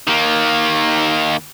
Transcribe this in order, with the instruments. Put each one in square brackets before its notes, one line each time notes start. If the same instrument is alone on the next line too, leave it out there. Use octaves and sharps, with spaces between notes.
[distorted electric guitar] D#3 A#3